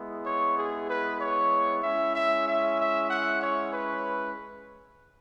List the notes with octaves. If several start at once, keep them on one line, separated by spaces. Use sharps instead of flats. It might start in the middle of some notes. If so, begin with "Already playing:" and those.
Already playing: G#3 B3 E4
C#5
G#4
B4
C#5
G#3 C#4 E4 E5
E5
E5
E5
F#5
C#5
B4